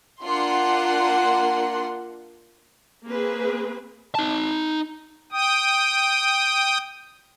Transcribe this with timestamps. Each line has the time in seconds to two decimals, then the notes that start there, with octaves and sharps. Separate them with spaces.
0.23 A#3 D4 F4 F#5 C6
3.06 A#3 C4 G#4 B4
4.15 D#4 A5
5.32 G5 D#6